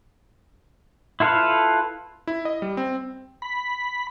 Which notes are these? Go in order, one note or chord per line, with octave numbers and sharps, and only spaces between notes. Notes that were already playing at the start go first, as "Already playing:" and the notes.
E4 F4 A4 B4 F5
E4
D#5
G3
C4
B5